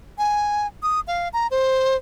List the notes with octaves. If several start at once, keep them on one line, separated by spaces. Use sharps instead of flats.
G#5
D#6
F5
A#5
C5